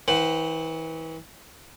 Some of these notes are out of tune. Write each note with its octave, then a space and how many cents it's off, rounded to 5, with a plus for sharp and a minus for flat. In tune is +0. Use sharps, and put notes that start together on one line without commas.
E3 -35 C5 -5 F#5 +10